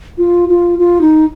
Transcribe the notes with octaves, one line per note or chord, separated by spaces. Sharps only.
F4
F4
F4
D#4